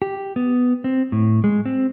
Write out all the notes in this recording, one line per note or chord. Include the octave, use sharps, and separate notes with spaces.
G4
B3
C4
A2
G#3
C4